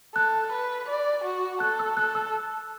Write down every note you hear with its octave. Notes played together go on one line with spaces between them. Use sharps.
A4 F#6
B4
D5
F#4
A4 F#6
E6
A4 F#6
E6